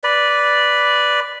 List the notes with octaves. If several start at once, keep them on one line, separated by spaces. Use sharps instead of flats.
B4 D5